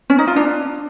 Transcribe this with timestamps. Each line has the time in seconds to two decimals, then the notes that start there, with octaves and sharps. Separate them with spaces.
0.10 C#4
0.19 D#4
0.27 F4
0.36 D4